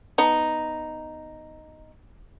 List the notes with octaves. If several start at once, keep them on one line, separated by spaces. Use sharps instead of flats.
B3 D#4